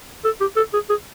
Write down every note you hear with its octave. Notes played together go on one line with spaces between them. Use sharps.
A4
G4
A4
G#4
G#4